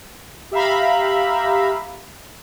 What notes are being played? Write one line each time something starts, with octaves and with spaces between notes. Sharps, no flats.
G4 E5 F5 A#5 B5